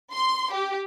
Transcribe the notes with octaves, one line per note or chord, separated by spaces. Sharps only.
C6
G4